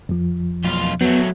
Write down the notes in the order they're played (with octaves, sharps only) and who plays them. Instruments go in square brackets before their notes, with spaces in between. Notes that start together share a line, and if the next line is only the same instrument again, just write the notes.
[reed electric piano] F2 F3
[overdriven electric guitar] B1 F4
[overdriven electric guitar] F#3 A3 [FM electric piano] B3